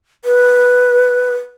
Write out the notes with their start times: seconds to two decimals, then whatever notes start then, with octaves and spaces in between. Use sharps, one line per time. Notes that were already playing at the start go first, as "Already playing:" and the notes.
0.25 B4